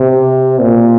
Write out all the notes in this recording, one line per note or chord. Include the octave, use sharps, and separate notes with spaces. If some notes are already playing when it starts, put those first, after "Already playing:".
Already playing: C3
A#2